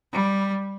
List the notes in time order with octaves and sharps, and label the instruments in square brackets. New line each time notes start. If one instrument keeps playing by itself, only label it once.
[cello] G3